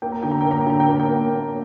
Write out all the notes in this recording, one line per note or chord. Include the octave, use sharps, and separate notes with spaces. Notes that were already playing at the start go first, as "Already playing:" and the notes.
A#3 G5
A#5
D3 G5
A#5
A#3 G5
A#5
G5
D3 A#5
G5
A#3 A#5
G5
A#3
A#3